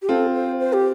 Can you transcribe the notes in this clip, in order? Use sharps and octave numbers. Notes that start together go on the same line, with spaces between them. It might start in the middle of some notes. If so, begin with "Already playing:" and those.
G4
C4 F4 A4
C5
C5
G4